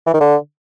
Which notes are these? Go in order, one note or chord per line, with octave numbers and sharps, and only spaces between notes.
E3
D#3
D3